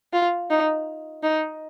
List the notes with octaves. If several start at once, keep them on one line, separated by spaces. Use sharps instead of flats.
F4
D#4
D#4